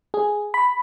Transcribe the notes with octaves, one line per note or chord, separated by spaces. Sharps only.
G#4
B5